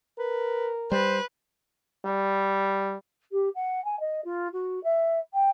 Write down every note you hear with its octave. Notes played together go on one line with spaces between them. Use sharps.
A#4 B4
G3 B4 C5
G3
G4
F#5
G#5
D#5
F4
F#4
E5
G5